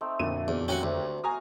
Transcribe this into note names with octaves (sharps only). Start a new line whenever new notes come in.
A3 C4 D#4
F2 A#2 D3 F#3 E4 A4 D#7
E2
D#2 C#4 F#4 F#5
D2
F#4 F5 G#5 A#5 D#6